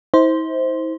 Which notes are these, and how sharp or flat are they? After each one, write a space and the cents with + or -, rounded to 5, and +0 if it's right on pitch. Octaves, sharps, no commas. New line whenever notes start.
E4 -45 C5 +0